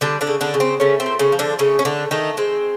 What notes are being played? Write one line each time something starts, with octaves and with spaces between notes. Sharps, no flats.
D3 G3 D4
D3 D4
C#3
D3 D4
C#3
C4
C#3 A3 C#4
C4
A#2
C#3 C#4
F3
D3 D4
C#3 A3 C#4
C#4
D3 A3 D4
D#3 A3 D#4
G#3 C4